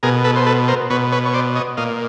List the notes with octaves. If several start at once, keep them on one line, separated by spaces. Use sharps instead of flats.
B2 G#4 A#4
A4 B4
C5
A4 B4
A#4 C5
B2 B4 C#5
B4 C#5
C#5
C5 D5
C#5 D#5
A#2 D#5 F5